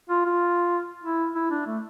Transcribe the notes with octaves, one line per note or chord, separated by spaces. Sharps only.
F4
F4
E4
E4
D4
A3